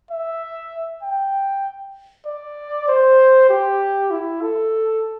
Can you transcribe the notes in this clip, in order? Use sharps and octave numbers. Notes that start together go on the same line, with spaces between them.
E5
G5
D5
C5
G4
E4
A4